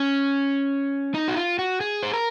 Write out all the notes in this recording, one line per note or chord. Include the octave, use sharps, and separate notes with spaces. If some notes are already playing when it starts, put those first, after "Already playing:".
Already playing: C#4
D#4
F#4
F4
F#4
G#4
C5
A#4